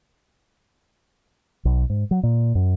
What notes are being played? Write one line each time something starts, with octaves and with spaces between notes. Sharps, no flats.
B1
G#2
F#3
A#2
F#2